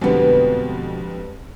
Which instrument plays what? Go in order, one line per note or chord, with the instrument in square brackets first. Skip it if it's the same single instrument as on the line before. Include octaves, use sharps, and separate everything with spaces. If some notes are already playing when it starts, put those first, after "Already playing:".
[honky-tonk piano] F2 D3 G3 [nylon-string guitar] B2 B3 [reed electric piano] G#3 C4 B4